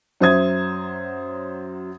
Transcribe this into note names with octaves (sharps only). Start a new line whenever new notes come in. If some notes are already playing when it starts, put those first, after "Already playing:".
F#2 F#3 C5 E5 D#6 G#6